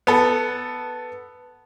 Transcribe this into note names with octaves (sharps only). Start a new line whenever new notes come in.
B3 A4